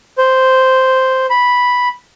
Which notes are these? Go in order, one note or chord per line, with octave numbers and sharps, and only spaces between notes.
C5
B5